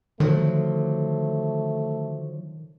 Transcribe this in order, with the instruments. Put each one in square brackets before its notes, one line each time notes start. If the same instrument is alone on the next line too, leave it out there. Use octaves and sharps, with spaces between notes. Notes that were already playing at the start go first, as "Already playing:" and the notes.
[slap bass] D3 F3 F#3 [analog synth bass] D#3 [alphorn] A3